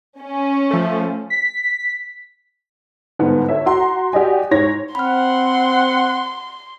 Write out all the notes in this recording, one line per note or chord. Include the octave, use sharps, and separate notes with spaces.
C#4
F3 A3
B6
G1 G#2 B3
A4 C#5 E5
F#4 A#5 C6
F#4 G4 D5 D#5 G#5
G#2 C#5 A#6
C4 F#5 B5 C6 F6